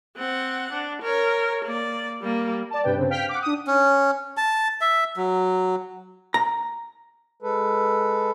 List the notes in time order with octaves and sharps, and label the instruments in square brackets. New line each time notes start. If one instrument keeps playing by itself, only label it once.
[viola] C4 F#5
D4
A#4 C#5
A#3 D5
G3 A#3
[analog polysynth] D5 A5
G2 C3 B4 G5
G2 C#3 C4
F5 G5 F6 B6
F#5 D6
D4 D#6
[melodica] C#4
A5
E5
F#3
[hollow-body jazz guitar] A#5
[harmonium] G#3 A4 B4